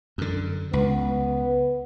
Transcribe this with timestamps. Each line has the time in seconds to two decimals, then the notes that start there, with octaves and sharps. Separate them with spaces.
0.18 F#2 D3
0.73 C#2 B3